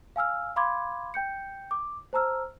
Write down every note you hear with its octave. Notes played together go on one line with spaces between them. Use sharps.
F5 G#5 E6 F6
F5 B5 C6 D6 G#6
G5 G6 C#7
D6
C5 A5 A#5 E6 F6